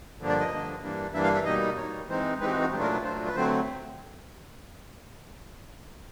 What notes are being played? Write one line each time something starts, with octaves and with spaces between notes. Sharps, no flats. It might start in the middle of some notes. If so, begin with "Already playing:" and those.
G2 D3 F3 A#3 D4
D5
D#5
G2 D3 F3 A#3 D4
G2 E3 G3 A#3 D4
G2 E3 G3 A#3 D4 E5
F5
E5
B2 G3 A#3 D#4 D#5
B2 G3 A#3 D#4 C#5
E3 G#3 C4 D#4 C5
E3 G#3 C4 D#4 B4
G4
F#4
F#4
A#2 F#3 A3 D4 F4 G4
A#4
B4
A#2 F#3 A3 D4 F4 C5
B4
D3 F#3 A3 C4 C5